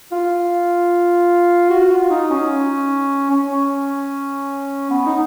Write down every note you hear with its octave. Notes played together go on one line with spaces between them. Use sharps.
F4
F#4
F4
D#4
C#4
C#4
B3
D#4